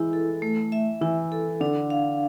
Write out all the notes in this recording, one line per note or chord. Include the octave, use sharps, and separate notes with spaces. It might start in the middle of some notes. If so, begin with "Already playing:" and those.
Already playing: E3 G#3 E4
A4
A3
E5
E3 E4
A4
D3 D4
F5